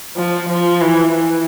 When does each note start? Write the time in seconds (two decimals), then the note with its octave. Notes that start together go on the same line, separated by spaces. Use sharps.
0.17 F3
0.49 F3
0.81 E3
1.14 E3